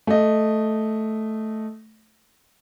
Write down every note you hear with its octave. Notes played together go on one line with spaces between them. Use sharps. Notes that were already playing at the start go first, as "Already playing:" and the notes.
A3 D#5